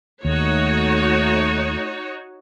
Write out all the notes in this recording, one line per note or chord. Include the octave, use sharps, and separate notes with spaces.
D#2 A3 D#4 F#4 C#5